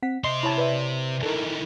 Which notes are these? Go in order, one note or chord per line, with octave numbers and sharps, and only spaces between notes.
C4 F#5 B6
C3 D#5 C6 C7
E4 C#5 A5 B5
B4 D5 E5
D#3 E3 A4 A#4